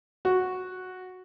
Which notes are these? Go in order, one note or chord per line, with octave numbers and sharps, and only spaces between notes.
F#4